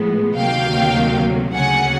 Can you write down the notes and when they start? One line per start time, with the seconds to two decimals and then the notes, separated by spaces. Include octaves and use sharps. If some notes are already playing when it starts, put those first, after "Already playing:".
Already playing: A2 F3 G#3 B3
0.36 D2 C3 D#3 F#3 A#3 F5 G5
1.55 D2 C#3 F#3 A#3 F#5 G#5